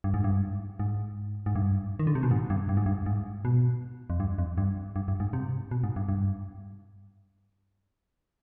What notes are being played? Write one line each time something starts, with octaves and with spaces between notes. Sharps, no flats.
G2
G#2
G2
G#2
G#2
G2
D#3
D3
C3
B2
G#2
G2
G2
G#2
G2
G#2
B2
F2
G2
F2
G2
G2
G2
G#2
C3
B2
G#2
G2
G2